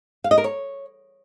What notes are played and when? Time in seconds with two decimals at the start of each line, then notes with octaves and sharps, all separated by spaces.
0.24 F5
0.31 D#5
0.38 A#4
0.44 C#5